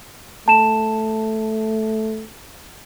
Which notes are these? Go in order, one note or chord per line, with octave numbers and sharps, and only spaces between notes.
A3 A5 E7